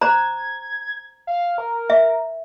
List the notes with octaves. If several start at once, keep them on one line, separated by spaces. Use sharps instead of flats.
C5 A#5 G#6
F5
A#4
E5